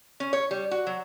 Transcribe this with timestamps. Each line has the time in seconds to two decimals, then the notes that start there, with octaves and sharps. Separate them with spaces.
0.20 C#4
0.33 C#5
0.51 G3
0.71 F#4
0.87 F#3